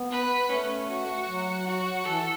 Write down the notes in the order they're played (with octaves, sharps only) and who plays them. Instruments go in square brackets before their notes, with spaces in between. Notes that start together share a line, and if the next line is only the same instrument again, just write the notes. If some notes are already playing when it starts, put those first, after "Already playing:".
Already playing: [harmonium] B3
[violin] B4
[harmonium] A3 [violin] C#4
[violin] F#4
[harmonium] F#3
[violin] F#4
[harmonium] E3 [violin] A4